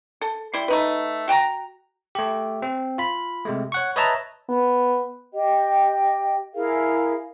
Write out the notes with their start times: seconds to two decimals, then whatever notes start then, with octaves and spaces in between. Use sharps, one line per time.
0.21 A4
0.54 G3 E4 C6
0.68 A3 D#4 B4
1.28 F#4 G5 A5 A#5
2.15 A3 G4
2.62 C4
2.98 F4 B5
3.45 C3 G#3 A3
3.72 C#5 F#5 C#6
3.96 B4 C#5 D#5 E5 A5 A#5
4.49 B3
5.33 G4 D#5 G5
6.54 E4 G#4 A#4 F5